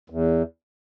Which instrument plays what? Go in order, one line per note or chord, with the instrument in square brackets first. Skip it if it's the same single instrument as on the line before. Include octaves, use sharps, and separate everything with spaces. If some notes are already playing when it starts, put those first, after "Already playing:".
[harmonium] E2